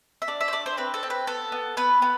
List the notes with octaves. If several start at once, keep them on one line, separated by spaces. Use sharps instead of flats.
E5
D4 D5
E5
C5
D4 D5
C5
C4 B4
A4
C4
B4
B3 A4
B3
B3 B4
B3